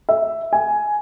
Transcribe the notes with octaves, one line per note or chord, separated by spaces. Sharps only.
E5
G#5